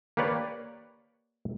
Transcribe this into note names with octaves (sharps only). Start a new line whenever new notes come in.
A#3 G4 B4 C#5 D5